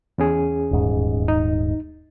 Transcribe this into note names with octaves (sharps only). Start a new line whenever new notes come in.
E2 C#4 G#4
D#1 G#2
D#4